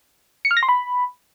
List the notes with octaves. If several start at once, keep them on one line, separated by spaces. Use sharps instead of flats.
C#7
F6
A#6
C6
B5